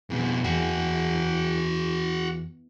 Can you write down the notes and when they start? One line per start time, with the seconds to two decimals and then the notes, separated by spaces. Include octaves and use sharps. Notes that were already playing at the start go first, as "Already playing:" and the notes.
0.10 F2 B2 G#4
0.44 E2 F#4 G#4